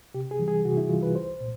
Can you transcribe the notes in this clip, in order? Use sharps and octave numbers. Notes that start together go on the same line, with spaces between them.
C3 G4
G#4
E3 G3
G#4
C3 F#4
E4
E3 G3 F4
B4
C2 C5
A#2